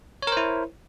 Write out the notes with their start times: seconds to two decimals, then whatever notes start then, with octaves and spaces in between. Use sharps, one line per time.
0.22 C#5
0.27 A#4
0.32 C5
0.37 E4